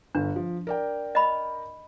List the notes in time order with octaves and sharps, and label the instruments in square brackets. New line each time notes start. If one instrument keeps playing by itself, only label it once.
[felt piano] G1 [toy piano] D4
[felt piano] F3
A#4 D5 G5
[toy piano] D#5 B5